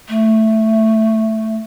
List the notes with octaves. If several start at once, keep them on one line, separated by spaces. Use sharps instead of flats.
A3